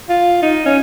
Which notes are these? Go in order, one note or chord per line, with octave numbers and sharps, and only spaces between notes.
F4
D#4
C#4